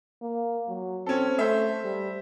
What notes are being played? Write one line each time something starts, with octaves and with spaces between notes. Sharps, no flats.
A#3
F#3
C4 C#4 A4
A3 C5 E5
G3